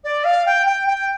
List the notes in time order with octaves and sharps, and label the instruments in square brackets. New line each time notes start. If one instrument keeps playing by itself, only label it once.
[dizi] D5
F5
G5
G5
G5